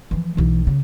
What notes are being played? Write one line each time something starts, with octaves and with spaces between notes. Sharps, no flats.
E3 F3
B1 E3
C#3